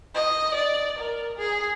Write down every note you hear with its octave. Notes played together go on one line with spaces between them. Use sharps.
D#5
D5
A#4
G#4